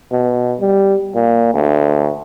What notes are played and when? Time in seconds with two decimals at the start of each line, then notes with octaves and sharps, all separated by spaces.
0.12 B2
0.60 G3
1.15 A#2
1.54 D2